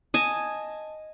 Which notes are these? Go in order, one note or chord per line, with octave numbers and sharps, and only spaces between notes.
D#5 G#5 A5